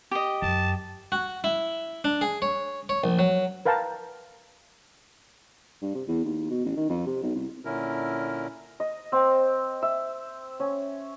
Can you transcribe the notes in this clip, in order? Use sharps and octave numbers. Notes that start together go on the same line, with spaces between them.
G4 D#5
F#2 A5
F#4
E4
D4
G#4
C#5
C#5
A#1
F#3
A#4 B4 F5 G5 A5 A#5
G2
C3
E2
D#2
B2
A1
D#3
F2
C3
B1
C2
A#2 D3 C#4 E4 A#4
D#5
C4
E5
C#4